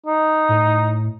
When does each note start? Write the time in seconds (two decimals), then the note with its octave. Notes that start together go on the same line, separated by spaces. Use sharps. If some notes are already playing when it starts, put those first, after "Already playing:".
0.06 D#4
0.49 A2